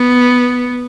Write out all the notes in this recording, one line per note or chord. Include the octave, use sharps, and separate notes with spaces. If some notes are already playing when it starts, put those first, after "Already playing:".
Already playing: B3